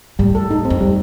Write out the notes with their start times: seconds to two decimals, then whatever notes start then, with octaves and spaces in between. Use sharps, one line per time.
0.19 A2 G3
0.35 A4
0.50 D#4
0.65 C4
0.70 F2
0.80 G3